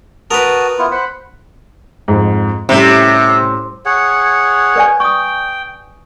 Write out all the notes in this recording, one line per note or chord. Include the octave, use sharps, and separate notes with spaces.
F#4 A#4 B4 A5 D#6
B3 E4 F4
C5 F#5 B5
F2 G#2
A2 C3 G3 C#4
G#4 C#5 F#5
B4 D5 G#5
G5 C#6 D#6